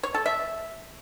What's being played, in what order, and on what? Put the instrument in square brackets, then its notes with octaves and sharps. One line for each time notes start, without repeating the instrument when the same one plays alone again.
[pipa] C#5
A4
E5